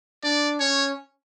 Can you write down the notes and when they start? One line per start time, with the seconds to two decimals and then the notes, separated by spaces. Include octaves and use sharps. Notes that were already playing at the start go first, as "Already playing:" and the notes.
0.24 D4 D5
0.60 C#4 C#5